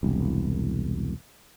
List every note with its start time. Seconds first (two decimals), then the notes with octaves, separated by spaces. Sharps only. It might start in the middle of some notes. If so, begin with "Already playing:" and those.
0.03 E1 C2